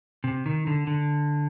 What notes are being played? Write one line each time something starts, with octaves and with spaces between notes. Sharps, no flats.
C3
D#3
D3
D3